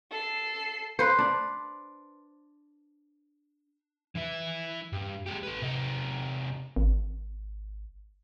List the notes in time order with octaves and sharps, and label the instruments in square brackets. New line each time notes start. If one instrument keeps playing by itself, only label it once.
[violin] A4 C7
[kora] B4 C5
D4
[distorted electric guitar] E3 E4
G2
G#3 G4
A4 B4
C3 D#4
[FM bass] G#1